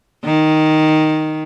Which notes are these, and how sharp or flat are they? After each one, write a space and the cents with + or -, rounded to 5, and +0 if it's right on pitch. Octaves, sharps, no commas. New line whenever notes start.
D#3 +0